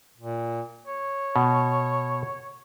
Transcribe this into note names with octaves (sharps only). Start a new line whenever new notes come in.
A#2
C#5
B2